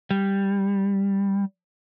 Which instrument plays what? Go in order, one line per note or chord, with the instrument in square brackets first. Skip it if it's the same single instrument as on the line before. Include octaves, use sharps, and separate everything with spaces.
[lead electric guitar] G3